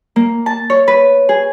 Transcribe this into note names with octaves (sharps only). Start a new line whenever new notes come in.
A#3
A5
C#5
B4
G#4